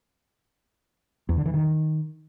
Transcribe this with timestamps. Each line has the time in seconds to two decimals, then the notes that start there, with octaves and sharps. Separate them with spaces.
1.29 E2
1.37 D3
1.46 E3
1.54 D#3